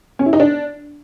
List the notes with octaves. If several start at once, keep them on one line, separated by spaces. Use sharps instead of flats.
C#4
E4
D#4
D4